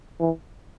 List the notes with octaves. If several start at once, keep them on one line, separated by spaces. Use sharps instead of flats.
E3